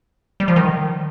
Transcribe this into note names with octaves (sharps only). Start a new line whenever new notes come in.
G3
F3
D#3